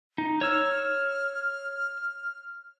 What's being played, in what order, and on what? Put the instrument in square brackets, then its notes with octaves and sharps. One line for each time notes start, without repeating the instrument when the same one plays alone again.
[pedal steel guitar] D#4
[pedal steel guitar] C#5 E6 [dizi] F6